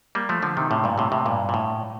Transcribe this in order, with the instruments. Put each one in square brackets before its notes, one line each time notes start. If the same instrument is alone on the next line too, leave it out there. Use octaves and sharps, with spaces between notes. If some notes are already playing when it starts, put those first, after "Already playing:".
[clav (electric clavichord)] G3 A#3
F3 A3
D3 F3
C3 D#3
A2 C3
G2 A#2
A2 C3
A2 C3
G2 A#2
A#2
A2